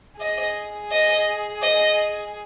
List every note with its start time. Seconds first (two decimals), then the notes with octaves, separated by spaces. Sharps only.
0.20 G#4 D#5
0.92 D#5
1.62 D#5